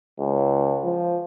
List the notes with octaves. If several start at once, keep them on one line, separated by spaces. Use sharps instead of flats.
C#2
F3